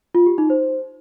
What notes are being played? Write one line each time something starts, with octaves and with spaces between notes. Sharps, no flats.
F4
G4
D#4
C5